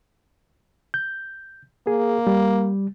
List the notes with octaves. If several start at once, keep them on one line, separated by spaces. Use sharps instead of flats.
G6
A#3 G#4
G3